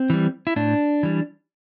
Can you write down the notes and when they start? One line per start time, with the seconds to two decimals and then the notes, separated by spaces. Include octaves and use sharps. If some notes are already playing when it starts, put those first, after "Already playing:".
Already playing: C4
0.10 E3 G3
0.47 E4
0.56 A2 D4
1.03 E3 G3